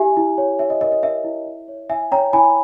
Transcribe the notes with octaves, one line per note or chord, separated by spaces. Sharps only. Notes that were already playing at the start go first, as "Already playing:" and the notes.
Already playing: E4 G4 E5 G#5
E4
C#5
C#5 E5
D#5
A#4 D#5
D#5
A#4 E5
E4
E4
C#5
E4 E5 G#5
C#5 G5 A#5
E4 G#5 B5